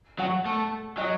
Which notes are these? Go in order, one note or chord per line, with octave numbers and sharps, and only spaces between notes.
F#3 F#5
A3
F#3 D#5